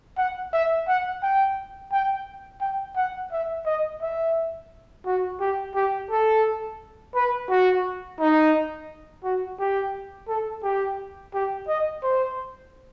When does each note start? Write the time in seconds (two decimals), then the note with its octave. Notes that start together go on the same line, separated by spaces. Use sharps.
0.17 F#5
0.53 E5
0.88 F#5
1.23 G5
1.92 G5
2.61 G5
2.96 F#5
3.32 E5
3.66 D#5
4.02 E5
5.06 F#4
5.40 G4
5.75 G4
6.11 A4
7.15 B4
7.50 F#4
8.20 D#4
9.24 F#4
9.60 G4
10.28 A4
10.63 G4
11.34 G4
11.68 D#5
12.03 C5